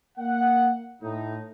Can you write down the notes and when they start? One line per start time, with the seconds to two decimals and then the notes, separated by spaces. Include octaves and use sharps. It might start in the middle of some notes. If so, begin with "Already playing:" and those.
0.17 A#3 F#5
1.01 A2 D#4